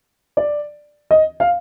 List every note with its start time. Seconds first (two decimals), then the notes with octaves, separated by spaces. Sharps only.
0.37 D5
1.11 D#5
1.40 F5